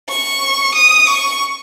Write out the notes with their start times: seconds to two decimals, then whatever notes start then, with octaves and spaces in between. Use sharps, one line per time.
0.09 C#6
0.74 D#6
1.07 C#6